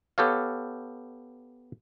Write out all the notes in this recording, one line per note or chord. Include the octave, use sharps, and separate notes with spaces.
B3 G4 A4 C#5 F5